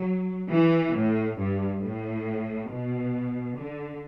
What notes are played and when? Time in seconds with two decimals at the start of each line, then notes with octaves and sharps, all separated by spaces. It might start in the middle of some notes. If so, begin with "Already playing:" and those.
Already playing: F#3
0.50 E3
0.94 A2
1.38 G2
1.82 A2
2.70 B2
3.57 D3